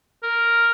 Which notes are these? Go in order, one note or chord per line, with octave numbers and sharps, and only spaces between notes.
A#4